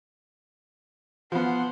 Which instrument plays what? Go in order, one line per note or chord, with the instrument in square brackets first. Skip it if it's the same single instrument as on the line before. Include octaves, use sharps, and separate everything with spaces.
[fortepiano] F3 B3 [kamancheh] F#5 C6